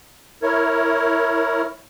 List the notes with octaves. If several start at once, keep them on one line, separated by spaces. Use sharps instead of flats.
E4 A#4 C#5